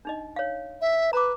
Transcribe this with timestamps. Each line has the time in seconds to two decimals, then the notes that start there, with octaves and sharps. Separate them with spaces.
0.05 D4 D#4 D#5
0.36 C#5 F5
0.81 E5
1.13 B4 A#5 D6